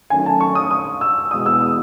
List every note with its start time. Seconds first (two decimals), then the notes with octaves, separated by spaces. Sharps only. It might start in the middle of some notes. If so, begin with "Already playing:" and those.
0.10 D#3 F#3 A3 C#4 G#5
0.26 A5
0.41 C#6
0.55 D#6
0.71 D#6
1.01 E6
1.31 E2 B2 G#3 D#6
1.46 E6
1.61 D#6